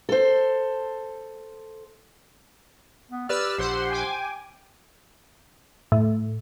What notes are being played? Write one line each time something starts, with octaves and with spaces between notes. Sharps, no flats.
A4 C5
B3
G4 B4 D5 E6 F6
A#1 C5 F#5 C6
G5 G#5 D6
A2